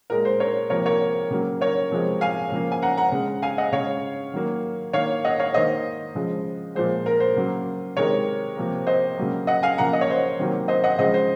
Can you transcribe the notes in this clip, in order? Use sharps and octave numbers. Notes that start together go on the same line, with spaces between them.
A#2 G#3 A#4
C5
A#4 C#5
C3 F3 A#3 A#4 C#5
A#4 C#5
C#3 F#3 A#3
A#4 C#5
C3 F3 G#3
F5 G#5
C#3 F3 A#3
G#5
F#5 A#5
F#5 A#5
C#3 G#3
F5 G#5
D#5 F#5
C#3 G#3 C#5 F5
D#3 F#3 A#3
D#3 A#3 C#5 F5
D#5 F#5
C#5 F5
D#3 A#3 C5 D#5
C#3 F3 G#3
A#2 F3 G#3 C5
A#4
C5
C#3 F#3 A#3
C3 D#3 G#3 A#4 C#5
C3 F3 A#3
C5 D#5
C#3 F#3 A#3
D#5 F#5
F5 G#5
C#3 F3 A#3 F#5 A#5
D#5
C#5
C5 D#5
C3 D#3 F#3 A#3
C5 D#5
D#5 F#5
C#3 F3 G#3 C5 D#5
C5